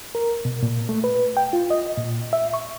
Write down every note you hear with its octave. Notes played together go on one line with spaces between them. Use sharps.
A#4
B2
A#2
A3
B4
G5
F4
D#5
A#2
E5
C#6